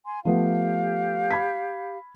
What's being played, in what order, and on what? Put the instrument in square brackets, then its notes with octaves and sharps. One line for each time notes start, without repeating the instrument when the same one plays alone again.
[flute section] G#5 C6
[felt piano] F3 A3 B3 [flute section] G4 F5
[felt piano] B5 G#6 B6